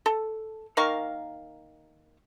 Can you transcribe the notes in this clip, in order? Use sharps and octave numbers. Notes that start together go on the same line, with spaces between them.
A4
D#3 A#3 F5 C#6